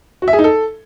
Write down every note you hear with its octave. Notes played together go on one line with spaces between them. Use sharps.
F#4
E5
G#4
D#4
A4